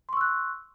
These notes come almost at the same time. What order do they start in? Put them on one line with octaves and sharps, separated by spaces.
C6 C#6 E6 F#6